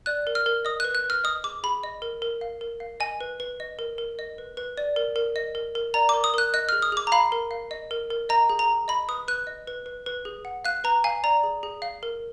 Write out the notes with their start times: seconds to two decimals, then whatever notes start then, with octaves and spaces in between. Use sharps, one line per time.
0.06 D5 F#6
0.27 A#4
0.35 F6
0.46 A#4
0.65 D#5 D#6
0.80 B4 F#6
0.95 F#6
1.04 B4
1.10 F6
1.24 D#5 D#6
1.44 G#4 D6
1.63 G#4 B5
1.83 D#5
2.02 A#4
2.22 A#4
2.41 F5
2.61 A#4
2.80 F5
3.00 D#5 G#5
3.20 B4
3.40 B4
3.60 D#5
3.79 A#4
3.98 A#4
4.19 D#5
4.38 B4
4.57 B4
4.77 D5
4.96 A#4
5.16 A#4
5.36 D#5
5.55 A#4
5.75 A#4
5.94 D5 A#5
6.09 A#4 D6
6.24 D#6
6.34 A#4 F#6
6.54 D#5 F#6
6.69 G#4 F6
6.82 D#6
6.92 G#4 D6
7.07 A#5
7.12 F5 B5
7.32 A#4
7.51 F5
7.71 D#5
7.91 A#4
8.10 A#4
8.29 D#5 A#5
8.49 G#4
8.59 A#5
8.69 G#4
8.88 D#5 B5
9.08 B4 D#6
9.28 B4 F#6
9.47 D#5
9.67 B4
9.86 B4
10.06 B4
10.25 G#4
10.45 F#5
10.65 F5 F#6
10.84 B4 A#5
11.04 F5 G#5
11.24 D5 A#5
11.43 G#4
11.63 G#4
11.82 F5
12.03 A#4